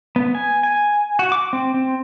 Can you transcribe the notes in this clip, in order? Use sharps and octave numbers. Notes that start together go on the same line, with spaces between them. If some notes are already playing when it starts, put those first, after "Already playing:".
B3
G#5
G#5
F#4
D6
C4
C4